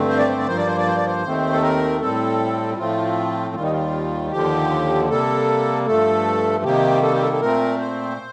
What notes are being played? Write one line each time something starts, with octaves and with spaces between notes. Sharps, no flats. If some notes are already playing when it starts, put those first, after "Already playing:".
Already playing: G2 D3 A3 C4
C5
D5
C5
D5
G2 F3 A#3 C5
D5
C5
D5
C5
D5
C5
D#2 D#3 A3 C4
A4
A#4
A2 G3 C4 A4
A2 F3 A3 C4 F4
D#2 D#3 G3 F4
D#4
F4
D#2 D3 F3 G4
C3 G3 A#3 A4
G2 F3 A3 A4
C3 D#3 G3 A#3 G4
A4
G4
A4
A4
A#2 A3 C4 A#4
C5